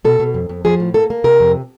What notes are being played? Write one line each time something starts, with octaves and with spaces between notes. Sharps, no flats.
B2 A4
B2
F2
F2
F3 G#4
A2
A#3 A4
A#3
C3 A#4
F2